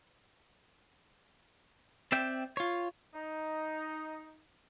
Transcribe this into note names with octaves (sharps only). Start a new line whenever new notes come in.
C4 D5 E5 G5
F4 C#5
D#4